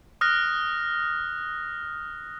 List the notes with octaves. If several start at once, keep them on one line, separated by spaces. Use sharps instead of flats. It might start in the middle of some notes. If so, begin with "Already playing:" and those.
D#6 F6 F#6 A#6